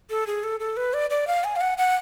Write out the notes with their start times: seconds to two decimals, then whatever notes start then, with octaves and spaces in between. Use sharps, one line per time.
0.10 A4
0.27 G#4
0.44 A4
0.60 A4
0.77 B4
0.94 D5
1.10 D5
1.27 F5
1.44 G#5
1.56 F5
1.61 F#5
1.78 F#5